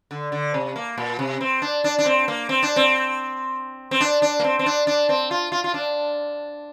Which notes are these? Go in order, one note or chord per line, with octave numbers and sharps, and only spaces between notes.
D3
D3
C3
A#3
A#2
C3
C4
D4
D4
D4
C4
A#3
C4
D4
C4
C4
D4
D4
A#3
C4
C4
D4
D4
C4
F4
F4
F4
D4